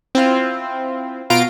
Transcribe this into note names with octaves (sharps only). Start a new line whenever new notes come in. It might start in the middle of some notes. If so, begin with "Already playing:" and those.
C4 E4 F4
B2 F4 F5 A#5 D7